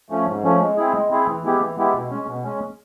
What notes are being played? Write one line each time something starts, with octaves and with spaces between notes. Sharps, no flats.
F3 A3 C#4
G#2
F3 A3 C#4
G#3
C4 E4 G#4
G#3
C4 E4 G#4
E3
G#3 B3 E4 G4
E3
G#3 B3 E4 G4
B2
G#3 C#4
B2
G#3 C#4